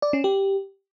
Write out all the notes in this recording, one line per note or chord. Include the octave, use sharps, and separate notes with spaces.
D5
C#4
G4